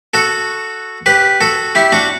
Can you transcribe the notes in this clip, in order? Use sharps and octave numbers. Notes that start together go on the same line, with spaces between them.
F#4 A4
G4 B4
F#4 A4
E4 G4
D4 F#4